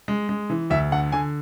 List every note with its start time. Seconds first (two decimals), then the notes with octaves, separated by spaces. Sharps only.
0.08 G#3
0.29 G#3
0.50 E3
0.70 D2 E5
0.92 D3 F#5
1.12 D3 G#5